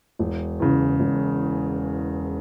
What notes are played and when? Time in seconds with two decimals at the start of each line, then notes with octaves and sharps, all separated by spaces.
0.19 E1
0.60 E2 C#3
1.00 E1